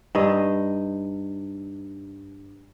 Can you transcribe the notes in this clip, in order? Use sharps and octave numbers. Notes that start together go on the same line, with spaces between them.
G2 D#4 D#5